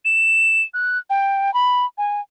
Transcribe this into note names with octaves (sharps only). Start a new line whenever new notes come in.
E7
F#6
G5
B5
G#5